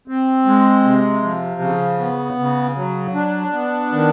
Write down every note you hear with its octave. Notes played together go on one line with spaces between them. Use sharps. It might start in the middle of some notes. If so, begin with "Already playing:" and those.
C4
G#3
C3
F3
C#3
B3
C#3
F#3
D4
B3
D#3